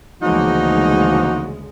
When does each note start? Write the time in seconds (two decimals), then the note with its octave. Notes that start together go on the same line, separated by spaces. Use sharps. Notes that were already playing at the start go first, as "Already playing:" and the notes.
0.22 D2 C#3 E3 F3 G#3 A#3 D#4 F#4